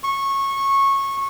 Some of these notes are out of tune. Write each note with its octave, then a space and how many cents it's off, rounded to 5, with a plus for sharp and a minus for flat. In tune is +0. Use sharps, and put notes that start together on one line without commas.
C#6 -15